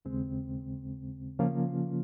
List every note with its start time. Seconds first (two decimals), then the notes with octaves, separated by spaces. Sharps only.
0.05 D#2 C#3 G#3 C4
1.39 C#3 F3 A#3 C#4 F4